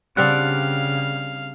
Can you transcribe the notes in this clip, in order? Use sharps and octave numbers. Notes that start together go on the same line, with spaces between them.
C#3 G3 C4 D4 F5 F#5